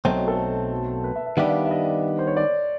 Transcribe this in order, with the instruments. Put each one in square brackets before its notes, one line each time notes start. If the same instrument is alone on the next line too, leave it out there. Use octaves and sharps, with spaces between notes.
[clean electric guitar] B1 B2 F#3 A3 C4 [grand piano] D#5
[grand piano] C#5
A4
B4
E5
E5
[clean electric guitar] D#3 G3 B3 D4 G4 [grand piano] E5
[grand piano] F5
E5
D#5
C5
C#5
D5